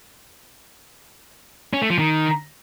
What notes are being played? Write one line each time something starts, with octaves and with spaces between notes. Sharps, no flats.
C#4
A3
F3
D#3